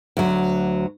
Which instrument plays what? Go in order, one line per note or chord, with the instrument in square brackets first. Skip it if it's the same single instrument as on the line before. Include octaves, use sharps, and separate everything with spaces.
[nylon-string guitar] D2 F#3